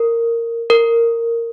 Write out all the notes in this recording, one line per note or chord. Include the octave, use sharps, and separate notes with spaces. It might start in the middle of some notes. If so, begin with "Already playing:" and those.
Already playing: A#4
A#4